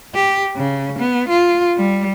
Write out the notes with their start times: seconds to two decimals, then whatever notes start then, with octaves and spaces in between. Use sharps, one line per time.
0.15 G4
0.56 C#3
0.99 B3
1.29 F4
1.77 G3